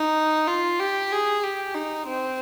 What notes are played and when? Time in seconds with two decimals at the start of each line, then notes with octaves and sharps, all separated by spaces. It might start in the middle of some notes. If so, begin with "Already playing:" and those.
Already playing: D#4
0.48 F4
0.80 G4
1.12 G#4
1.44 G4
1.75 D#4
2.07 C4